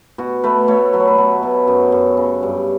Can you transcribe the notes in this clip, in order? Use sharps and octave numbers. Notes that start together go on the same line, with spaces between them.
B2 F#4
A3 B4
A3 C#5
F#3 B4
C#5
B4
B2
B2
F#2
F#2
C#3
G2